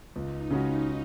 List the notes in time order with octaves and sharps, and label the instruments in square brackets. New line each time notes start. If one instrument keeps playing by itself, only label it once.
[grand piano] C#2 [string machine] D#4
[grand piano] C#3 G#3 C#4 F#4 [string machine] D#4